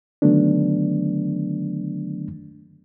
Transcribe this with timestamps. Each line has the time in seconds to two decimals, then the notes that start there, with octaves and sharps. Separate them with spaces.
0.22 D3 D#3 F#3 A3 B3 D4